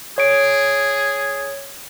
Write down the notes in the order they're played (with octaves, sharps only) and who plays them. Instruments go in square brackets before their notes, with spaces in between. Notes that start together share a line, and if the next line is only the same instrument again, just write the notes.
[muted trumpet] G#4 [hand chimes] C#5 D7